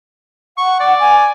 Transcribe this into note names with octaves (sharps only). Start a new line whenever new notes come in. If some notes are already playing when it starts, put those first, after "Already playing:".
F#5 C#6
D5
G#5